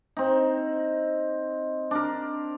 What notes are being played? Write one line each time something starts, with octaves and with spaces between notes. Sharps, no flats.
C4 D#4
D4 A#4